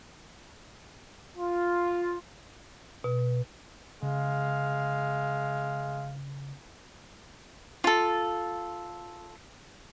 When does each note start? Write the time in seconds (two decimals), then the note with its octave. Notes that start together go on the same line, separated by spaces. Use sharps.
1.35 F4
3.04 B2
4.03 C#3 G#3 F5
7.84 F4 A4